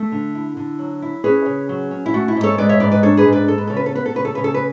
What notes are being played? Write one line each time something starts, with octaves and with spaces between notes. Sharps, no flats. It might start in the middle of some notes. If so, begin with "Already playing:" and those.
Already playing: A3 A4
D3
E4
D3
F#3
E4
C#4 G#4 B4
C#3
F#3
C#4
E4
A3 F#4
E4
G#2
A4 C#5
G#3 B4 D5
C#5 E5
G#2 B4 D5
B4 D5
D4 A4 C#5
G#4 B4
G#2
B4 D5
G#3 A4
B4
C#3 A4
B4
A4
B3 B4
A4
C#3 B4
A4
C#3 B4
A4
B4